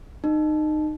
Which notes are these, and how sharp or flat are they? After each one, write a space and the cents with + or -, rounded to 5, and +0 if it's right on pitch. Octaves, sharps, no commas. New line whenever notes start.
D#4 -25